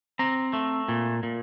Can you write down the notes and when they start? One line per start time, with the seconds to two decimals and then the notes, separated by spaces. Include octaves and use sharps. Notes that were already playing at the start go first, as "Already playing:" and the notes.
0.19 C4 A#5
0.53 A3
0.88 A#2
1.23 A#2